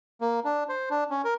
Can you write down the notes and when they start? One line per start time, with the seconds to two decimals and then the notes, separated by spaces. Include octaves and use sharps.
0.21 A#3
0.44 D4
0.69 C5
0.90 D4
1.10 C#4
1.25 A#4